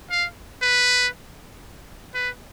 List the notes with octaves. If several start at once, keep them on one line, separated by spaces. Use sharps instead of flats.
F5
B4
B4